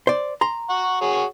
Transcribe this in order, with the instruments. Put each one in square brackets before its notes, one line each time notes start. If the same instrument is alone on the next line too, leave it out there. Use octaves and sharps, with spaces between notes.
[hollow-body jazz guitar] C5 D5
A#5 C6
[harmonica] F#5 C#6
F#4 G#4 C#5